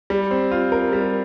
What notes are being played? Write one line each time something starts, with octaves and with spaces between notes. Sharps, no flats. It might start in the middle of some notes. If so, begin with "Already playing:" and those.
G3
C4
F4
A#4
G3